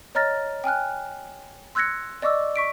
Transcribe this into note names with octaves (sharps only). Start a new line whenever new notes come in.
C#5 D#5 A#5 F6 A6 A#6
G5 G#5 F6 F#6
C6 E6 F#6 G#6 A#6 C#7
D5 D#5 C#6 D6 E6
C#6 B6 D7